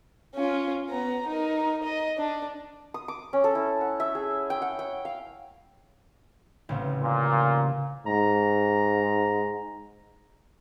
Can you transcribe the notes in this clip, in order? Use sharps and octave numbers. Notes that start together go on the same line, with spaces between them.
C#4 F4
B3 A#5
D#4 A#4
D#5
D4
D#6
D6
C#4
A4
E4
F#5
E5
G#4
G5
F#5
G5
F5
A1 C#3 C4
A#2
G#2 A#5